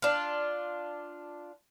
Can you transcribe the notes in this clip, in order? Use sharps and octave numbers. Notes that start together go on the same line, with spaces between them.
D4 F4